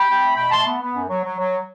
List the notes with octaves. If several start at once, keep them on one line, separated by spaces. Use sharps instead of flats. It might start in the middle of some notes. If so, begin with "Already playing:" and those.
Already playing: G5 B5
C4
A3
B2 G5 B5
A3 A5 C6
B3
B3
F#2
F#3
F#3
F#3